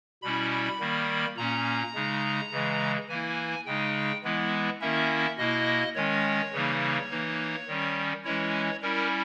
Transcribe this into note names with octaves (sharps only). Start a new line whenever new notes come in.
B2 G3 C#4 E4 B5
B5
D#3 G3 A#3
A#2 A#3 C#4 A#5
C#3 G#3 D#4
C#3 E3 G#3
E3 A#3 E4 G#5
C#3 G#3 D#4 G5
E3 G#3 B3 E4
D#3 A#3 C#4 E4 E5
B2 A#3 E4 D#5
D#3 G#3 C#4 C#5
C#3 E3 G3 A#3 D#4
E3 A#3 D#4
D#3 G3 C#4
E3 G#3 C#4 E4 C#5
G3 C#4 E4 A#4